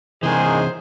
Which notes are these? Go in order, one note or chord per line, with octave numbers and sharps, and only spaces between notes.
G#2 C3 D#3 E3 G#3 G#4 C5